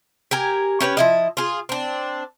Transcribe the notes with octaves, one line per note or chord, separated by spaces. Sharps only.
G4 A#4 G#5
C#4 G4 B4 C#5
F3 E4 D#5
F4 G#4
C4 D4